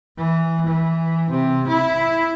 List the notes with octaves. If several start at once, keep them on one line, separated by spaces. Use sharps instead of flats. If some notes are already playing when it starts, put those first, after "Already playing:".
E3
E3
C3
E4